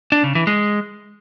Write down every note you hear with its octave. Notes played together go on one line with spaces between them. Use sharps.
D4
C#3
E3
G#3